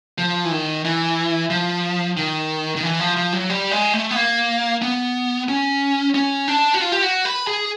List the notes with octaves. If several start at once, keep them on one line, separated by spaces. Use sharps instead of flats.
F3
E3
D#3
E3
F3
D#3
D#3
E3
F3
F3
F#3
G3
G#3
A3
B3
A#3
B3
C#4
C#4
D4
F#4
F4
G4
F#4
B4
G#4